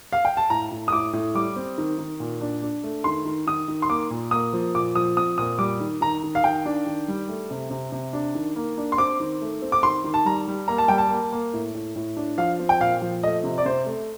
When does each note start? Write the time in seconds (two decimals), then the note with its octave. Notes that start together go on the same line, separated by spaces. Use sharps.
0.13 F5
0.25 G5
0.37 A5
0.50 A2 A#5
0.72 A2
0.88 D#6
0.92 A2 D6
1.13 A2
1.35 G3 D6
1.56 C4
1.78 D#3
1.98 D#3
2.20 A#2
2.41 D4
2.62 D4
2.84 A3
3.04 D#3 C6
3.25 D#3
3.47 D#3 D#6
3.68 D#3
3.82 C6
3.89 A#3 D6
4.11 A#2
4.31 A#3 D#6
4.53 F3
4.75 A#2 D6
4.95 F3 D#6
5.17 C4 D#6
5.38 A#2 D#6
5.59 G3 D6
5.80 D#3
6.01 D#3 A#5
6.23 D#3
6.35 F5
6.44 D#3 G5
6.65 D4
6.86 D#3
7.08 G3
7.29 A3
7.51 C3
7.71 C3
7.92 C3
8.13 D4
8.35 D#3
8.56 A#3
8.78 D4
8.92 C6
8.98 C4 D6
9.20 D#3
9.42 A3
9.62 C4
9.72 D6
9.83 D#3 C6
10.04 D#3
10.14 A5
10.25 G3 A#5
10.48 G3
10.68 A#3 A#5
10.78 A5
10.88 G3 G5
10.98 A5
11.10 A#3
11.33 A#3
11.54 A2
11.74 A2
11.96 A2
12.17 D4
12.37 F3 F5
12.60 C4
12.69 G5
12.80 A#2 F5
13.02 F3
13.23 A3 D#5
13.44 C3
13.58 D5
13.66 C3 C5
13.86 A3